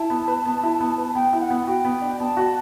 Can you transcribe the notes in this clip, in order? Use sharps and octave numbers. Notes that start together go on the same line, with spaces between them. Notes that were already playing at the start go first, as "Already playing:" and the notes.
Already playing: E4 A5
B3
B4
B3
E4
B3
B4
B3 G5
E4
F#5
B3
F#4 G5
B3
D4
B3 A5
F#4